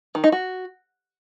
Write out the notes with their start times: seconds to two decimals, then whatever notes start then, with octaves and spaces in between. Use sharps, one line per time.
0.15 D#3
0.24 D#4
0.32 F#4